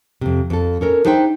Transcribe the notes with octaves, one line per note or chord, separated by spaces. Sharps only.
F2 C3
F2 A4
C#4 A4 A#4
D4 D#4 G#4 C5 E5 G5